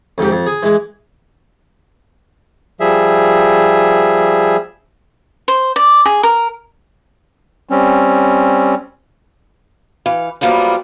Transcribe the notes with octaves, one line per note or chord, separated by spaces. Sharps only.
F2 G#2 G4
F2
G#4
E3 G#3
F3 G3 G#4 E5
C5
D5
G#4
A#4
G3 C4 C#4
E3 F5
F#2 F3 G3 A#3 B3 F4